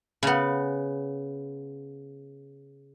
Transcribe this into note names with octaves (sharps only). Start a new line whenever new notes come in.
C#3 B3